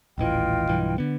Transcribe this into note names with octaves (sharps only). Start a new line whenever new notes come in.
D#1 A1 E3 F4 D#5 G5
B1 G2 E3
D3 B3